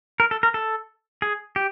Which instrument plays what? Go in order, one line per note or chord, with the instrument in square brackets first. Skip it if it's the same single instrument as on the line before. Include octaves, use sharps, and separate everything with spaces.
[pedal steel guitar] A#4
A4
A#4
A4
G#4
G4